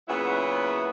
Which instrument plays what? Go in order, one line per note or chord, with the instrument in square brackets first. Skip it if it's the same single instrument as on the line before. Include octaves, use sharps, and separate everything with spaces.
[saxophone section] A#2 C#3 F#3 B3 E4 F#4